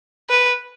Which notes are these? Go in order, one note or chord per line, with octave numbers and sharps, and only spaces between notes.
B4